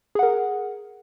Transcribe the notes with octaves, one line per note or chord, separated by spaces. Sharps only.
G#4 A#4 F#5